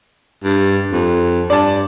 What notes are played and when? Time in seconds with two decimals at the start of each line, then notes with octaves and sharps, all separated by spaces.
0.44 G2
0.92 F2
1.50 G2 D5 A5